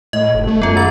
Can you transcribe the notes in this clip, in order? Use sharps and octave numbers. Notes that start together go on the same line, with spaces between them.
A2 D#5
F1
A3
F#2 B3 F4
D#3 A6